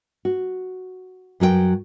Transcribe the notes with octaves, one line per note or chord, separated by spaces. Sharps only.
F#4
F#2 F#3 G4 G5